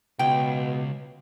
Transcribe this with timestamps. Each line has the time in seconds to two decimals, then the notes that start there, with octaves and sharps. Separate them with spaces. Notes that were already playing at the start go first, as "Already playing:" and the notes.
0.19 C#2 B2 G5